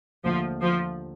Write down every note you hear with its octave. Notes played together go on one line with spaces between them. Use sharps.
D#2 D3 F3 A3
F3